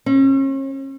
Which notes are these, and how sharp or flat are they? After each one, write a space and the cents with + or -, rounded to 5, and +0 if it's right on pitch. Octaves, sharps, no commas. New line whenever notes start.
C#4 -40